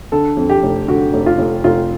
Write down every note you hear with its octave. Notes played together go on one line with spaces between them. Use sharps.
D3 A4
F2
G4
F1
D3 F#4
F1
F4
F1
F1 F4